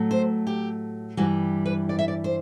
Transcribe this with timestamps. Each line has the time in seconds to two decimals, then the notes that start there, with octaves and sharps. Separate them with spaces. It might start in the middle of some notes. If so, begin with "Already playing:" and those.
Already playing: A2 F#3 A3
0.11 C5
0.47 G4
1.17 G2 E3 G3 F#4
1.65 B4
1.89 D5
1.99 E5
2.08 D5
2.24 C5